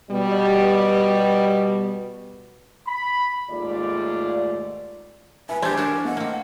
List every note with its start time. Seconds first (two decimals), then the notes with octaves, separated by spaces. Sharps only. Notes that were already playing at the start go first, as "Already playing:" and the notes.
0.11 B2 G3
2.88 B5
3.50 D#2 G#2 A3 F4 D5
5.49 E4 B4 G#5
5.62 A3 D4 G4 C5 G#5 G#6
5.77 D4 E4 F#4 A#4
6.05 A3 A4 D#5 F#5
6.17 A#3 C4